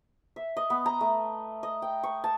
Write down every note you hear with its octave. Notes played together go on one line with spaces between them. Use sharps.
E5
D#5
B3
A#5
A3
D#5
G5
C#6
A5